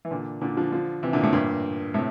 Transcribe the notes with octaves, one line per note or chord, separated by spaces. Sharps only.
E3
A#2 D3
A#2 D3
D3 F3
D3 F3
C3 E3
A#2 D3
A2 C3
G2 A#2
A2 C3